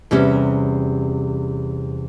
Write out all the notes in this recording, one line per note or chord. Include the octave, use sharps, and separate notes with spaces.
E2 C3 G3 C#4